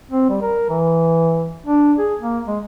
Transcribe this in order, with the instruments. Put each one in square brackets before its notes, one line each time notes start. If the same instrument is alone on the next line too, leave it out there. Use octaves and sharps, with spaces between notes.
[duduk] C4
G3
A#4
E3
D4
G#4
A#3
G#3